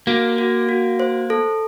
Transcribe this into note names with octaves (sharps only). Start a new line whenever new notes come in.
A#3 F#4
F#4
F#4
C5
A4